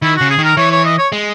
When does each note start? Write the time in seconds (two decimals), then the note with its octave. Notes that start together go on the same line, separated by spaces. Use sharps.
0.02 D#3 E4
0.16 F#4
0.21 C#3
0.30 G#4
0.39 D#3 A#4
0.57 E3 C#5
0.71 C#5
0.85 D#5
0.98 C#5
1.12 G#3